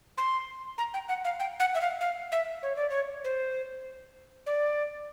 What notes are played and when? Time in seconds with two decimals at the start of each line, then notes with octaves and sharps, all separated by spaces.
0.18 C6
0.78 A#5
0.94 G5
1.09 F#5
1.25 F5
1.40 G5
1.60 F#5
1.75 E5
1.81 F5
2.01 F5
2.32 E5
2.63 C#5
2.76 D5
2.90 C#5
3.24 C5
4.46 D5